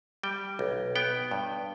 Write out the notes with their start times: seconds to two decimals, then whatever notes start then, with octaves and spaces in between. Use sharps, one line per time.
0.23 G3 G5
0.59 B1
0.96 B3 G5
1.31 G2